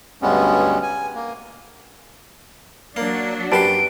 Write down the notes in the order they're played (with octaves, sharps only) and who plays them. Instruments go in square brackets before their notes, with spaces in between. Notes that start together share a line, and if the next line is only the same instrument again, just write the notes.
[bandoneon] D2 G2 G3 G#3 B3 C#4
G#5
A#3
[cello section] F#3 D4 [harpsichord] A#3
[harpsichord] F#2 D5 C6 [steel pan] G4 B4 A5 [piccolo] D7